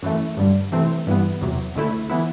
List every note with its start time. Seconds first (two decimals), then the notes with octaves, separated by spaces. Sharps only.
0.02 F#2 E3 A3
0.37 G2 D3 G3
0.72 C3 E3 A3 C4
1.07 G2 E3 B3
1.41 E2 C3 F#3
1.75 D2 D3 A3 E4
2.09 E3 B3 E4